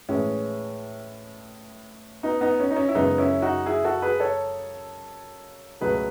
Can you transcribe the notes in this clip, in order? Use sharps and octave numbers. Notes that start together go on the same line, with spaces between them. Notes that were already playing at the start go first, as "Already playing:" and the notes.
A2 E3 G#3 C#4
B3 D#4
B3 D#4
C#4
D#4
C#4
E4
F#2 C#3 G#3 B3 D#4
C#4 E4
D#4 F#4
E4 G#4
F#4 A4
G#4 B4
A4 C#5
C#2 B2 F#3 A3 G#4 B4